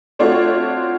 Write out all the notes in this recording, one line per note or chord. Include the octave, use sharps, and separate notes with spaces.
A3 C4 D4 F4 F#4 C#5